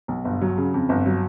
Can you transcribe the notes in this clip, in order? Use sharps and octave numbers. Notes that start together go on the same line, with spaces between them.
B1
G1
F#3
C#3
F2
G1
F#3